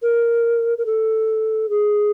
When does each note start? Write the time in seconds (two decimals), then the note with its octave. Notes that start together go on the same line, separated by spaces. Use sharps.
0.02 A#4
0.77 A#4
0.85 A4
1.69 G#4